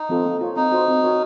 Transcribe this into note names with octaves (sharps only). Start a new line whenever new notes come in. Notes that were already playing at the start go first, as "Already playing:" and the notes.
Already playing: D#4
F3 C4 F4 A4
A#3
F4 A#4 C#5
C4 D#4
F#4 C5
C4
F#4 A#4 C#5